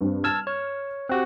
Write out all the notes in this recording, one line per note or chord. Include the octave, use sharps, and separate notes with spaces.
G2 C4
A5 E6 F6 G#6 E7
C#5
C4 F#4 G4 F#6